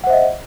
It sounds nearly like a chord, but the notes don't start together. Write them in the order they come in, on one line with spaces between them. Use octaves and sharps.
F#5 C5 E5 D#5